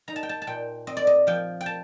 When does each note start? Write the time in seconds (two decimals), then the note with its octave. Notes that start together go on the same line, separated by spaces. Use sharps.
0.08 D#4 A#5
0.16 A5
0.23 G5
0.29 A5
0.42 A5
0.47 A#2 G5
0.87 C4 D#5
0.97 D5
1.07 D#5
1.27 F3 G5
1.61 G5
1.66 A5